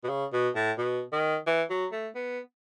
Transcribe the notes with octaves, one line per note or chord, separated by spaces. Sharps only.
B2
C#3
B2
A2
B2
D#3
E3
F#3
A3
B3